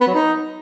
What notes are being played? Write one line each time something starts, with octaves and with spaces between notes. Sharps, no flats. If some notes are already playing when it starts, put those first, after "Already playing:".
B3
F#3
D#4